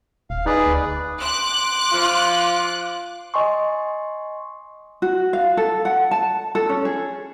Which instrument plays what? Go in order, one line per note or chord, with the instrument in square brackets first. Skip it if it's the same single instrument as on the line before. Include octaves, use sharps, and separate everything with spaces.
[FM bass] D#1 [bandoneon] F5
[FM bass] D#4 [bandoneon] G#4 B4 D5
[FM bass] D2
[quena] C6 [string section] D6 F#6
[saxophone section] F3 F4
[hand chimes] D#5 G#5 C6 C#6
[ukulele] F#4
F5
A4
F#5
A5
A4
C#4
G#4